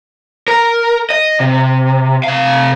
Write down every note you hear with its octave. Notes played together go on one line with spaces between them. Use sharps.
A#4
D#5
C3
C3 F5